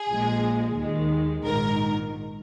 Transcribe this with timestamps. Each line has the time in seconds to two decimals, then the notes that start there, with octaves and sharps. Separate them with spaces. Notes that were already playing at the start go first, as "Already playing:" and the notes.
Already playing: G#4
0.08 A#1 A#2 F3 G#3
0.76 D#2 D#3 G#3
1.45 A#1 G#2 D#3 A#4